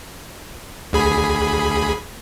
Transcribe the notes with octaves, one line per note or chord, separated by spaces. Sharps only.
D2 G#4 B5